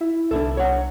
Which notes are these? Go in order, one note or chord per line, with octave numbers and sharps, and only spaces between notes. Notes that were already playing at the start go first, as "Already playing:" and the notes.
E4 E5
C2 D4 E4 A4
C#5 F#5